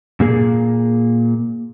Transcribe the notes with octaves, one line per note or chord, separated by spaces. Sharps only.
A#2 A#3 G#4